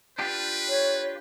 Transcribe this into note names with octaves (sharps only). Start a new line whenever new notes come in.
D4 F4 G4 B4
C#5